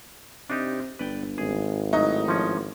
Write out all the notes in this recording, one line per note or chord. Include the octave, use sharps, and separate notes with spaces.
C3 D4 D#4 G4
G1 B4 D5 G5
G#1 G#4
A2 F#3 D#4
F3 C#4